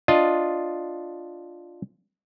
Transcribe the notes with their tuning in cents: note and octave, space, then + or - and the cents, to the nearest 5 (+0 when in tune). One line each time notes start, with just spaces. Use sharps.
D4 -5 F4 +0 D#5 +0